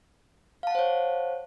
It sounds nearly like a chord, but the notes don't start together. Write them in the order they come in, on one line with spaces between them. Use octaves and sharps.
F5 A5 F#5 C5 C#5